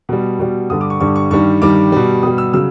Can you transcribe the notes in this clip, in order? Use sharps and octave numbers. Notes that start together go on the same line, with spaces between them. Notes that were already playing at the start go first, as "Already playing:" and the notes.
B2 G3
B2 G3
G2 D3 G3 D#6
D6
C#6
G2 D3 G3 C#6
C#6
G2 D#3 G3 C#6
G2 D#3 G3 D6
B2 G3
B2 G3 D#6
E6
C#3 F#3 E6